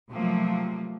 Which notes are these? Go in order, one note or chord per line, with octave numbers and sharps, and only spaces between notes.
C3 F3 F#3 A3 A#3